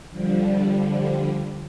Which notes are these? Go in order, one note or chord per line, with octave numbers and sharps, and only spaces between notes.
D3 F3 G3